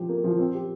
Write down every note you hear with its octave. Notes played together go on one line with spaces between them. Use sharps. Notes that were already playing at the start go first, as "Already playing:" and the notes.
Already playing: F3 G4
A#3
F3
C4
G4